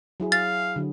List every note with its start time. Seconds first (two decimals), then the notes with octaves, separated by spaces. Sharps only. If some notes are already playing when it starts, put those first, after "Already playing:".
0.20 F#3 E4 G#4
0.32 F5 A6
0.76 D3 F#3